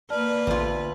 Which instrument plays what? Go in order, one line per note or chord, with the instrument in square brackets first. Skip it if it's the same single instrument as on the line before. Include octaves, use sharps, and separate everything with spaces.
[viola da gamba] A#3 B4 [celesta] D5 A5 F6
[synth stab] A1 [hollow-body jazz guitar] D2 F4